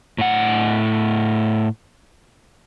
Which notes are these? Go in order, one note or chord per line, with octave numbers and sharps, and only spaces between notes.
A2 F#5